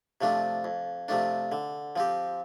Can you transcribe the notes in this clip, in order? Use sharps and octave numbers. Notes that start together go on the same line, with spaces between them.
C3 F3 A3 D4
F2
C3 F3 A3 D4
D3
F3 C4 G4